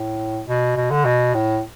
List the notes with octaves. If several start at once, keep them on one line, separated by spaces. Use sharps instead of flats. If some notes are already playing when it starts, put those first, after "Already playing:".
Already playing: A2
B2
B2
D3
B2
A2